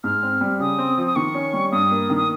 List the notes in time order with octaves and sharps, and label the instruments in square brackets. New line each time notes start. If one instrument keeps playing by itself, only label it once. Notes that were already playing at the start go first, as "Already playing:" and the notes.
[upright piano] G#2 [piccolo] F6
[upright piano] C4
G3
[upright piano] C#3 [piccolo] D#6
[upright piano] C4
F3
[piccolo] D#6
[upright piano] D#3 [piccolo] C#6
[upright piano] C#4
G3
[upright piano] G2 [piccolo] D#6
[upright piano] A#3
D#3
[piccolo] D#6